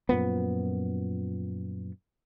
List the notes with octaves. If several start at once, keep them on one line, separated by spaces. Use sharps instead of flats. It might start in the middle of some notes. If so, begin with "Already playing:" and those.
F#2 A#2 F3 B3